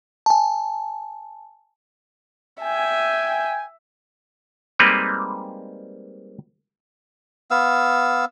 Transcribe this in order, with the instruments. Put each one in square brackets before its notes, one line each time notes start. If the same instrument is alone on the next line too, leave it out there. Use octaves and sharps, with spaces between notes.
[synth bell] G#5 A5
[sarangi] E5 [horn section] G5 G#5
[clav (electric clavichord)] G3 G#3 A#3 C4 D#4 B4
[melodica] B3 F5 E6